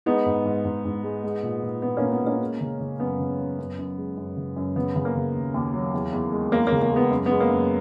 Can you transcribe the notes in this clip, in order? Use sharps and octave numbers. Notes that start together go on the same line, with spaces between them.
G#3 B3 D#4
G#2
G#2
G#2
G#2
G#3
G#3
A#2
A#2
A#2 B3
A#2 A#3 C#4
B3
A#2
A#3 C#4
G#3
C#3
C#3
F#2 B3
C#3
F#2
F#2
F#2
G#3
F#2
C#3
F#2
C#3 B3
C#3
A#3
C#3
D#2
D#2
F#3
E2
E2
G#3
E2 A#3
C#3 A#3
A#3
G#3
B3
F#2
G#3 B3
A#3
F#2